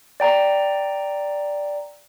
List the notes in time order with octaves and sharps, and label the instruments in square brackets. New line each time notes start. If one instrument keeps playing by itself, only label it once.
[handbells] D5 G5 A#5